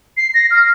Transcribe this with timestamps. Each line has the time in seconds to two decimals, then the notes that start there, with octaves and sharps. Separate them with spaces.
0.17 C7
0.34 A#6
0.51 F6